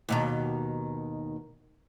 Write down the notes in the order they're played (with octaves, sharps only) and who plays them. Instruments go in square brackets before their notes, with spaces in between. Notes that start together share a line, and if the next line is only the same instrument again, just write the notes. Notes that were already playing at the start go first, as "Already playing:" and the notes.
[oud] D#2 B2 D#3